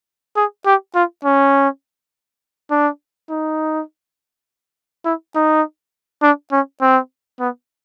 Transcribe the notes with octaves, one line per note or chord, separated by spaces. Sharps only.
G#4
G4
F4
C#4
D4
D#4
E4
D#4
D4
C#4
C4
B3